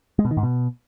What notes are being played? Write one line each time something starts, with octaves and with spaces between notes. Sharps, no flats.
G#3
B2
D#3
G#2
B2